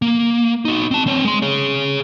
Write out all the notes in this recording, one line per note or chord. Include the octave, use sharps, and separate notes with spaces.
A#3
D#4 F#4
C4 A5
C4 C#5
G#3 C6
G#4 C#5